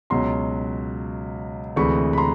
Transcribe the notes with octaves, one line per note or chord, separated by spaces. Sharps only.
C#2 B2 F#3 A#5 C6
D2 C3 E3 G#3 B5 C#6
B5
A#5 C6